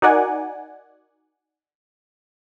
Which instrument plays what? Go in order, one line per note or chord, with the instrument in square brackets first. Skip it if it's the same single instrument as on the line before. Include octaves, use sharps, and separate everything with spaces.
[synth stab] D#4 F#4 A#4 D5 F#5 G#5